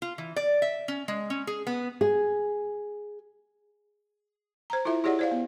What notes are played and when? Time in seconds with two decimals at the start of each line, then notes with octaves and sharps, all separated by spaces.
0.02 F4
0.18 E3
0.36 D5
0.62 E5
0.88 C#4
1.08 G#3
1.30 C#4
1.47 G#4
1.67 B3
2.01 G#4
4.70 C5 A#5
4.85 E4 F4 A4 E5
5.04 E4 G4 G#4 C#5 D5 F#5
5.19 C5 D5 F5
5.31 B3